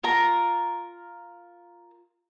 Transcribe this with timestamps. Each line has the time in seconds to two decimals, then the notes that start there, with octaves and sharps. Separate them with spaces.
0.04 F4 A#4 A#5